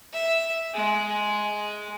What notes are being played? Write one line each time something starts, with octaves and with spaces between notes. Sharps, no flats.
E5
G#3